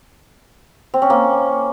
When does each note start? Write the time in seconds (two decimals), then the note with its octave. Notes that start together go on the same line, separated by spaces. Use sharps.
0.94 C4
1.02 C#4
1.10 A#3